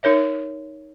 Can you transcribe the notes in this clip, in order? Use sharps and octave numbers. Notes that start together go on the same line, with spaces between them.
D#4 A#4 C#5 E5